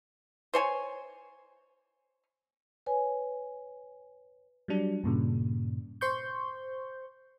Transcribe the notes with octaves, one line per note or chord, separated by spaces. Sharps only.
C5 C#5 G#5
B4 C#5 G#5
F#3 G3 D4
G2 A#2 C#3
C5 C6 C#6 G6